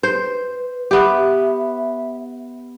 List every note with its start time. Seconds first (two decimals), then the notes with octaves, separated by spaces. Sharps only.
0.03 B4 C5
0.91 B3 G4 E5